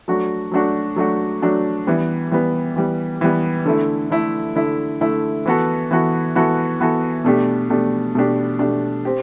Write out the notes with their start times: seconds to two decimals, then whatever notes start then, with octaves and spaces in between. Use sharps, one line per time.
0.08 F#3 A3 D4 F#4
0.51 F#3 A3 D4 F#4
0.96 F#3 A3 D4 F#4
1.42 F#3 A3 D4 F#4
1.87 E3 G3 B3
2.31 E3 G3 B3
2.76 E3 G3 B3
3.21 E3 G3 B3
3.66 D3 A3 E4
4.10 D3 A3 E4
4.56 D3 A3 E4
5.01 D3 A3 E4
5.46 E3 B3 F#4 A4
5.91 E3 B3 F#4 A4
6.35 E3 B3 F#4 A4
6.80 E3 B3 F#4 A4
7.24 B2 A3 D4 G4
7.70 B2 A3 D4 G4
8.15 B2 A3 D4 G4
8.59 B2 A3 D4 G4
9.05 C4 G4